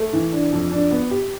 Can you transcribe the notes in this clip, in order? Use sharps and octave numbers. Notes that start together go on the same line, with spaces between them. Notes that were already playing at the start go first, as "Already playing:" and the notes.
Already playing: A3
E3
D4
F2
D4
B3
G4